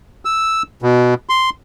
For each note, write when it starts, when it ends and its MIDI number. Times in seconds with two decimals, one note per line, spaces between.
0.25 0.63 88
0.82 1.14 47
1.29 1.50 84